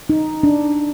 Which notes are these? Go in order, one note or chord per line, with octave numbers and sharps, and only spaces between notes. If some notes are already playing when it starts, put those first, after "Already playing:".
D#4
D4